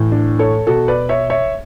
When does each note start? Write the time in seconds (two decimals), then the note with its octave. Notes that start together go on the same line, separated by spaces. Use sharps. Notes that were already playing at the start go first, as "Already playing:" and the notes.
Already playing: A2 E3
0.12 D4
0.39 A4 C#5
0.67 B2 F#4 A4
0.88 B4 D5
1.09 C#5 E5
1.30 C#5 E5